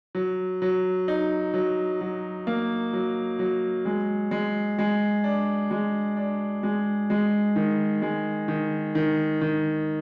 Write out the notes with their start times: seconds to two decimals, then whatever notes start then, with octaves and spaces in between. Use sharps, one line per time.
0.15 F#3
0.62 F#3
1.08 D#4
1.54 F#3
2.01 F#3
2.47 A#3
2.93 F#3
3.39 F#3
3.85 G#3
4.31 G#3
4.79 G#3
5.24 D4
5.71 G#3
6.17 D4
6.63 G#3
7.10 G#3
7.56 D#3
8.02 G#3
8.48 D#3
8.95 D#3
9.41 D#3